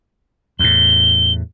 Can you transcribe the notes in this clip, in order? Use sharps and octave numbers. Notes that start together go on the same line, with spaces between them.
E2 A2 G7